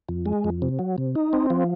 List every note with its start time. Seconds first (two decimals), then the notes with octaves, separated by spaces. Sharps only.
0.09 F2
0.26 G#3
0.44 F2
0.62 C3
0.79 F#3
0.98 C3
1.16 D#4
1.33 C4
1.50 F3